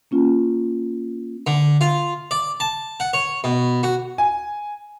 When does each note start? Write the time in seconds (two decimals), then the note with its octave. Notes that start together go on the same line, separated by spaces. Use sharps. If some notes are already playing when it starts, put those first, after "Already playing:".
0.11 A#3 C#4 F4
1.47 D3
1.81 F4
2.31 D5
2.60 A5
3.00 F#5
3.13 C#5
3.44 B2
3.83 F#4
4.18 G#5